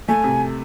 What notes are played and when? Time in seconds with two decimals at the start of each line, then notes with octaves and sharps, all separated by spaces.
0.08 A3 G#5
0.24 C3